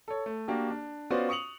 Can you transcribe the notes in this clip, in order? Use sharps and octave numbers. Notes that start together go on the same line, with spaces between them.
A4 C#5
A3
A#3 D4 F#4 G4
D4
B3 C#4 F4 F#4 C5 D5
C#6 D#6 C#7 F7 F#7